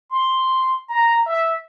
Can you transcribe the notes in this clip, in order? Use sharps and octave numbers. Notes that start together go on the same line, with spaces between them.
C6
A#5
E5